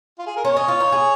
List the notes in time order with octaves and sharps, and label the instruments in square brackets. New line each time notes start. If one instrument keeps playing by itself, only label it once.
[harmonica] F4
G#4
A#4
[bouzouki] C#4 [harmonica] C#5
[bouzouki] D#4
F4
D#4
G#4